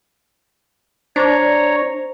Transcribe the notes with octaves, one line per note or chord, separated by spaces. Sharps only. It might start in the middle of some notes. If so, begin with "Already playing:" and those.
D4 C5 C#5 A#5